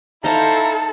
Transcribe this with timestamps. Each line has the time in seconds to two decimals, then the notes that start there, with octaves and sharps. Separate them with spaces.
0.24 D#4 E4 A4 C5 F5 A#5